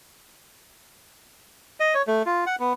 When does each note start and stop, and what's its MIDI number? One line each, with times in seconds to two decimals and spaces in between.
1.80 1.94 75
1.94 2.02 73
2.07 2.22 57
2.26 2.44 65
2.47 2.56 78
2.60 2.73 59